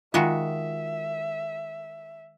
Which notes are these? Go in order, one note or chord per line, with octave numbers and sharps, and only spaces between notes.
D#3 G#3 F4 F#4 E5 F5